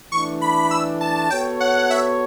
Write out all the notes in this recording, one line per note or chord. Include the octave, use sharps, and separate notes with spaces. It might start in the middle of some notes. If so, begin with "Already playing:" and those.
E3 A3 D4 C#6
B5
E6
A5
B3 F#4 A4 C#5 G5
F#5
E5